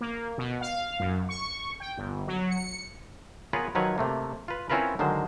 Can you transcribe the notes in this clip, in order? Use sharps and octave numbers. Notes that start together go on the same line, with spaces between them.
A#3
B2
F5
F#2
C#6
G5
G1
F#3
C#7
B3 F4 G#4 A#4 B4 C#5
D#3 F3 F#3 B4 C#5
C3 A3 A#3
F4 B4
C4 C#4 E4 F4 A#4 B4
D3 D#3 F#3 G#3 C5